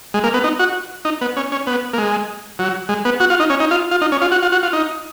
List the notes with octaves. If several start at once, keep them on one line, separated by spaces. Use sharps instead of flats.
G#3
A#3
B3
D#4
F#4
D#4
B3
C#4
C#4
B3
A#3
G#3
F#3
G#3
B3
F#4
F4
D#4
C#4
D#4
F4
F4
D#4
C#4
F4
F#4
F4
F#4
F4
D#4